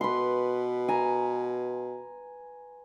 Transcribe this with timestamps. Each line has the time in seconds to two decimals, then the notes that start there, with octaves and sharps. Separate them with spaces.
0.01 B2 B4 C6
0.88 G#5 A#5